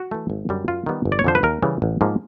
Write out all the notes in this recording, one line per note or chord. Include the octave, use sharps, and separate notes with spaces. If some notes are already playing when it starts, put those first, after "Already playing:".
Already playing: F#4
E3 A3
G#1
F#2 D3 G3
F#2 F4
D#3 G3 B3
G1
D5
C#5
F2 D3 F3 C5
B4
D#2 A#4
C#3 E3 G3
A1
G#2 F3 A#3